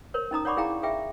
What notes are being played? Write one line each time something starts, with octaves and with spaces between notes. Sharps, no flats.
A#4 C5 C#5
C#4 D#4 A#5 D#6
C#5 D5 F#5 B5 C#6 D6
E4 G#4 F5 G5 A#5
G#4 E5 G5